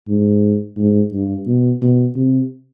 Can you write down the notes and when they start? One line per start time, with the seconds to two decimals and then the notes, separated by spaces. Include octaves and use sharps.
0.08 G#2
0.78 G#2
1.13 G2
1.47 B2
1.81 B2
2.16 C3